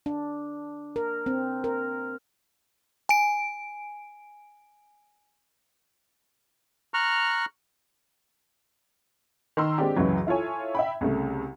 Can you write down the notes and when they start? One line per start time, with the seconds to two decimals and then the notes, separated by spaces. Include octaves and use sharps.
0.06 D4
0.96 A#4
1.26 C4
1.64 A#4
3.09 G#5 D7
6.94 A#5 C#6 F6 F#6
9.57 D#3 A#5 C6 E6
9.78 G#3 C4 D4 G4
9.96 C#2 F#2 E3 F#3
10.27 E4 F4 A4 C#5 G#5
10.75 E5 G5 B5
11.01 C2 C#3 A3